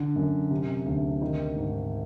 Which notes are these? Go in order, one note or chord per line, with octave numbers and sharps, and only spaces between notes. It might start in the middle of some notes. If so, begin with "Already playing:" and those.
Already playing: D3
F#2
C3
D2
D#3
G#2